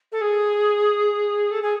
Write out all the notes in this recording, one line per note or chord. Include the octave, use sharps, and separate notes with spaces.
A4
G#4
A4
G#4